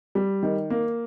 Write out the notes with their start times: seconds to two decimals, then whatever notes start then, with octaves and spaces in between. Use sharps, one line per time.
0.15 G3
0.43 D#3
0.70 A#3